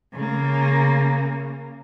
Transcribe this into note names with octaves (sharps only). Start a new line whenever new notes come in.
C#3 A#3